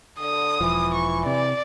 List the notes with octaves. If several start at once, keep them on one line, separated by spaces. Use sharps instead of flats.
D3 D#6
E1 E3 F3
C#6
C3 D5